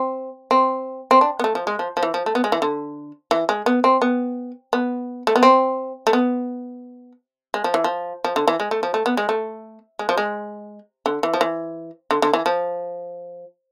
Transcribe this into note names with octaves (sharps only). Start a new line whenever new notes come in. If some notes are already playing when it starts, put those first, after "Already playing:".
Already playing: C4
C4
C4
D4
B3
A3
F3
G#3
F3
F3
E3
F3
A3
B3
G#3
E3
D3
E3
G#3
B3
C4
B3
B3
A3
B3
C4
A3
B3
G#3
F3
E3
F3
F3
D3
E3
G#3
A3
F3
A3
B3
G#3
A3
G#3
F3
G#3
D3
E3
F3
E3
D3
D3
E3
F3